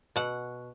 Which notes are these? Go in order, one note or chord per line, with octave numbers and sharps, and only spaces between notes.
B2 F#5